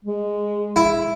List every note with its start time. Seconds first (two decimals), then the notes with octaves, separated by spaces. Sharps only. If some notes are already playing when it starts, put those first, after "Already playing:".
0.04 G#3
0.76 E4